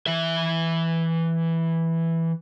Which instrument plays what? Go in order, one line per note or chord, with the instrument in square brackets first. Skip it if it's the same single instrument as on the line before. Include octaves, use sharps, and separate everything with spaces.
[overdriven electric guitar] E3 E5